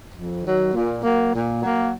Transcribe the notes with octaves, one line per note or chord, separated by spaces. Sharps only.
F2
D#3 F#3
A#2
F#3 A#3
A#2
F#3 A#3